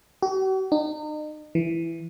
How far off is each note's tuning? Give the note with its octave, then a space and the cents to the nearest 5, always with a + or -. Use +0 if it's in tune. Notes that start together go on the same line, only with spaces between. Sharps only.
F#4 +45
D#4 -40
E3 +10